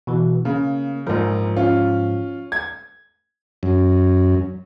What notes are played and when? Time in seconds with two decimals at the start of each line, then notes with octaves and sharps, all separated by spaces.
0.07 B2 E3
0.45 C#3 A#3
1.07 A#1 G#2 F3 A#4
1.56 C#4 F4
2.52 G#6
3.63 F#2